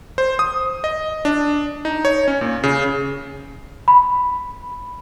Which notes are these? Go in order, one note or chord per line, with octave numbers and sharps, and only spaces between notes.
C5
D#6
D#5
D4
D#4
C#5
C#4
A#2
C#3
B5